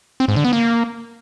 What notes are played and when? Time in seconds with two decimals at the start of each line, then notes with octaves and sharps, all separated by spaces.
0.20 C4
0.28 G#2
0.36 D3
0.45 B3
0.53 A#3